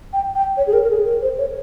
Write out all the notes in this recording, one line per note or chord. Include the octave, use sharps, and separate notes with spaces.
G5
G5
C#5
G#4
A#4
A#4
G#4
A#4
C5
C#5